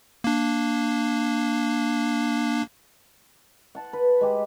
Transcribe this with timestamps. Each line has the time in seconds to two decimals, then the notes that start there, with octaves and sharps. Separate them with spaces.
0.24 A#3 D4
3.75 F#5 A5 C6
3.93 B4
4.21 G#3 G4